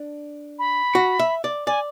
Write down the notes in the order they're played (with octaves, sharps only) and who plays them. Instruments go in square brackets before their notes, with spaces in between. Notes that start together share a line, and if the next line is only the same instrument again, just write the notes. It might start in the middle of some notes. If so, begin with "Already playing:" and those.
Already playing: [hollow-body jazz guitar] D4
[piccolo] B5
[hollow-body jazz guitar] F#4
E5
D5
[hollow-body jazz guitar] D5 [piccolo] G#5